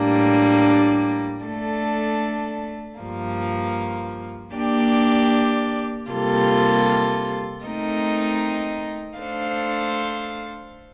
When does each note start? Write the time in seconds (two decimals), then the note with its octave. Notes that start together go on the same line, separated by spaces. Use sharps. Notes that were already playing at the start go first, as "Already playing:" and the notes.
Already playing: A2 G3 A#3 D4
1.46 A3 D4 A4
3.01 G2 F3 A#3
4.55 A#3 D4 G4 D5
6.10 C3 G3 A#3 F4 A4
7.64 A3 C4 D#4 A#4 D#5
9.18 A3 D4 A4 C5 F5